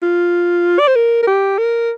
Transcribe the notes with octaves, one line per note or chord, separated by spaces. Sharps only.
F4
D5
C5
A#4
A#4
G4
A#4